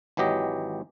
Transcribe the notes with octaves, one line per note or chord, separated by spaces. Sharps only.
G#1 E3 F#3 G4 D#5